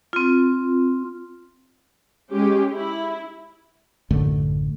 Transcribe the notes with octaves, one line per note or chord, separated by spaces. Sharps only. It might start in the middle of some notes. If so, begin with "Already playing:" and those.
C4 F4
G#3 C#4 G4
E4
A1 F#2 D3 A3